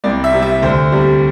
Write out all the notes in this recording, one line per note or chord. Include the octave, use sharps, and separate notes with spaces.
C2 D5
E5
C3 G3
E5
D2 C5
C3 G3